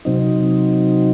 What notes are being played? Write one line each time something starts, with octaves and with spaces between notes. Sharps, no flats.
C3 F#3 C4 D#4